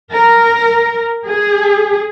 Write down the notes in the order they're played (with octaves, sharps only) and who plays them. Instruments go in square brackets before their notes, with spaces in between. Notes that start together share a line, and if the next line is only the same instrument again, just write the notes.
[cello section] A#4
G#4